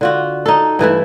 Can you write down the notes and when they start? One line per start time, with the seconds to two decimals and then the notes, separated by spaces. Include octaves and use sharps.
0.01 D3 F4 F#4
0.46 D#4 A4
0.79 G2 E3 A3 E4